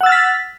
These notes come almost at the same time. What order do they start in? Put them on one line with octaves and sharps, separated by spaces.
F#5 E6 A6 F6 B6